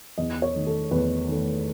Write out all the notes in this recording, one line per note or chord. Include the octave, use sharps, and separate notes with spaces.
E2 D#5
C#5
D#3 A3
A4
E2 B4
D#3 A3